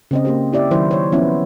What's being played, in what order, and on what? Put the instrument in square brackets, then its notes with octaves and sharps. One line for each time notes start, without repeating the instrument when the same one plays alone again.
[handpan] C#3 C4 D#5
A#3 G4 C5
E4 G4 D5 E5
D#3 F#3 E4 C5
C5 C#5
F3 B3 C#4 E4